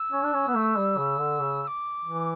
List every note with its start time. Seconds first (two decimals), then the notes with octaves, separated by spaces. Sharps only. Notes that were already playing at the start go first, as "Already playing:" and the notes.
Already playing: E6
0.12 C#4
0.24 D4
0.33 C#4
0.48 B3
0.55 A3
0.77 G3
0.98 C#3
1.19 D3
1.40 C#3
1.62 E6
1.67 D6
2.05 E3